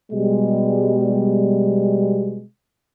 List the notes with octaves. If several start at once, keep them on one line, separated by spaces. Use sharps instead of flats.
B2 G3 G#3